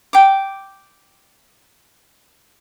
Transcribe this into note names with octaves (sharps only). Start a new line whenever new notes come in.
G5 D6